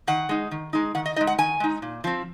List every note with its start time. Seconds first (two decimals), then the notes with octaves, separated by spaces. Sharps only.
0.07 D#3 F#5
0.29 G#3 D#4
0.51 D#3
0.73 G#3 D#4
0.95 D#3 F#5
1.06 D#5
1.16 G#3 D#4 D#5
1.27 F#5
1.38 D#3 G#5
1.60 G#3 D#4
1.82 A#2
2.04 F3 C4